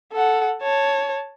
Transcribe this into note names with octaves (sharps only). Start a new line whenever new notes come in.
A4 F#5
C#5 A5